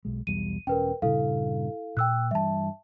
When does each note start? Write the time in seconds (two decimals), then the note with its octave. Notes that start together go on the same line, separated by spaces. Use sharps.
0.05 B1 G#3
0.27 B1 E2 G3 D#7
0.67 E1 C#4 A#4 B4 G5
1.02 G2 A#2 C#3 E4 A4 F5
1.97 A#2 G5 E6 F#6
2.31 G2 E3 G3 E5 A5